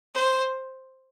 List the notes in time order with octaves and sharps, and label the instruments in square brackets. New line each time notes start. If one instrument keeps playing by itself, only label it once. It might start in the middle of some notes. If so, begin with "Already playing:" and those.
[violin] C5